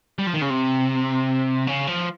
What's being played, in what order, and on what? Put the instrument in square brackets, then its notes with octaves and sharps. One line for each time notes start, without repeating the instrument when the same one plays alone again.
[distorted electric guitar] G3
F3
D#3
C#3
C3
C#3
F3